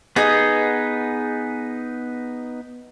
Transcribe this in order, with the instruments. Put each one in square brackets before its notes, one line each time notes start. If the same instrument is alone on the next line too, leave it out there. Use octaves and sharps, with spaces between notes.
[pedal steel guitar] B3 D#4 [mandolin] G#4 D#5